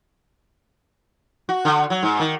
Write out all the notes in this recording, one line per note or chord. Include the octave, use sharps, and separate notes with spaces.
F#4
D3
F#3
G#2
D#3